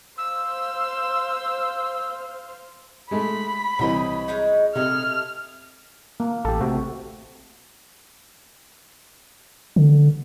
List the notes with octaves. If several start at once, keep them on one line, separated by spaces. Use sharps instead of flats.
C5 F5 E6
G#3 A3 B5
C2 E3 C4 C#5 D#5
F#3 G#3 D#4
C3 E4 A4 D#5 F6
A#3
A1 G4 A4
C3 A3 F#4 G5
D3